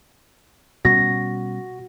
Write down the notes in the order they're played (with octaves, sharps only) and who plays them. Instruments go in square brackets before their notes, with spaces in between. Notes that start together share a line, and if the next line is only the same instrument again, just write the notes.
[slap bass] B2 G3 C#4 [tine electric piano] F#4 [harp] A#6